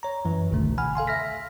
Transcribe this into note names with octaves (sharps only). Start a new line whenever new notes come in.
C#5 A#5
F#2 E3
G#1 C#2 B2 D3 D#3 A3
F#5 G#5 B5 F6
A4 F5 G#5 C6
E5 F6 A#6 B6